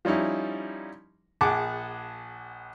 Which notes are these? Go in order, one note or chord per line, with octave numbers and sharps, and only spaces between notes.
F3 G3 C#4 D#4 E4
A#1 G#4 F#5 A5 D6